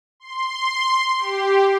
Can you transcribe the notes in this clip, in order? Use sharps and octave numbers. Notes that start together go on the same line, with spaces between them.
C6
G4